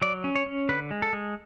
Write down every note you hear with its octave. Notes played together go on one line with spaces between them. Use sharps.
F#3 D5
C#4
C#5
C#4
D3 B4
G#3
A4
G#3